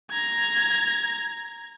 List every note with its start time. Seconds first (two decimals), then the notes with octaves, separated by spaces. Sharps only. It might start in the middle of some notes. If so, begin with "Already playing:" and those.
0.11 A#5 G#6